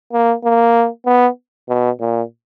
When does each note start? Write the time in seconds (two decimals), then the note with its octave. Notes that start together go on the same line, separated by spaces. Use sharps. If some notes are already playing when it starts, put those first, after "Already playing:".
0.13 A#3
0.44 A#3
1.06 B3
1.69 B2
2.00 A#2